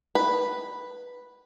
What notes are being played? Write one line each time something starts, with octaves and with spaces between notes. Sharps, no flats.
B4